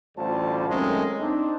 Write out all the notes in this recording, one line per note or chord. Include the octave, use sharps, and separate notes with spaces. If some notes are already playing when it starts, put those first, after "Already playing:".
A1 D2 G3 F4 C5 A5
F#2 D#3 G#3 A3 C4 C#4
C4 D4 D#4